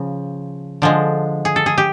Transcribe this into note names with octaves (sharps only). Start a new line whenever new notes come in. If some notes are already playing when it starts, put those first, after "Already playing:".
Already playing: C#3 F3
D3 F3 G#3
G#4
A4
G#4
G4